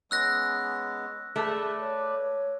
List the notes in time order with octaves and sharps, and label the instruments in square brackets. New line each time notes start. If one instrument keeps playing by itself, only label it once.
[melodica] G#3 B3 C#4 [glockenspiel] E6 F#6 A#6
[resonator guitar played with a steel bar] A3 [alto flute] G#4 [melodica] B4 D5
[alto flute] C#5